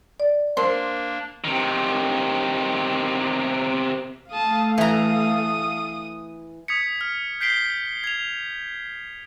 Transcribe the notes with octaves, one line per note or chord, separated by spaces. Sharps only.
D5
A#3 D4 A#4 C5 C6
C3 D#3
A3 A4 F5 A5 D#6
E3 A#5 D#6
D#6 G#6 B6 C#7
F6
G6 B6 C7 D7 G7
G#6 F7